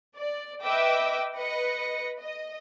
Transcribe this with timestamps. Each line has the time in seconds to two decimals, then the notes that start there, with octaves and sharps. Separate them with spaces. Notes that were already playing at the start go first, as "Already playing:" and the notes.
0.16 D5
0.63 B4 D#5 E5 G5 D6 E6
1.35 B4 D#5 A#6 C#7
2.21 D#5